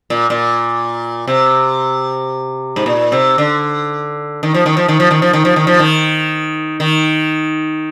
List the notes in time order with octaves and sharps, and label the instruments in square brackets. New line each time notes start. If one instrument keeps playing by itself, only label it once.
[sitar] A#2
A#2
C3
G#2
A#2
C3
D3
D#3
F3
D#3
F3
D#3
F3
D#3
F3
D#3
F3
D#3
F3
D#3
D#3